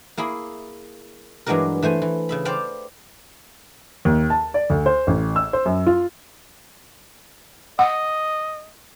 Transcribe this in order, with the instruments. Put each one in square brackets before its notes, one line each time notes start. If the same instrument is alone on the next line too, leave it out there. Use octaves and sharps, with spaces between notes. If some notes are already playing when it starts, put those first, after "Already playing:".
[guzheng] A#3 E4 G#4 B5
G2 E3 F#3 G#3 D4 A#4
E3 A3 C5 G#5
E3
C#3 E5 B5
C5 D5 F5 G5 A5 B5
[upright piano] D#2
A5
D5
D2
C5
A1
E6
C5
F#2
F4
[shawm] D#5 [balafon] F#5